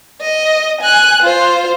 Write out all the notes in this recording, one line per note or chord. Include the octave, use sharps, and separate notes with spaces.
D#5
G#5 F#6
F4 C5